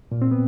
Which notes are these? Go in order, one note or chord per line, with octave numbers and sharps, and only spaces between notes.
A#2
C4
B3